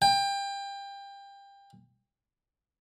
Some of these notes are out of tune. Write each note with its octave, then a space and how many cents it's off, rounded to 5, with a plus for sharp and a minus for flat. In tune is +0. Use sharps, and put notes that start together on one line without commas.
G5 +25